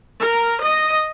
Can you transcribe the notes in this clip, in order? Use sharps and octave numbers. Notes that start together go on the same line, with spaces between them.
A#4
D#5